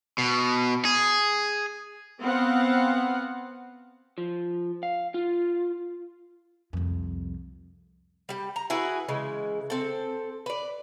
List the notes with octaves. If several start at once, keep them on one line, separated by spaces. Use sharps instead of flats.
B2
G#4
B3 C4 F5 F#5
F3
F5
F4
C2 F2
G3 G4
A#5
E4 F#4 G#4 B4
C#3 E3 G#3
C4 A4
B4 D5